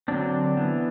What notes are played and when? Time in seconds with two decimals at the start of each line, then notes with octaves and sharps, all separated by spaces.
0.08 D3 F#3 C4 D4
0.57 E3 B3